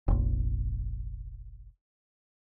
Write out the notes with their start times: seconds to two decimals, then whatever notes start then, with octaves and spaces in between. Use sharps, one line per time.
0.08 F1 A#1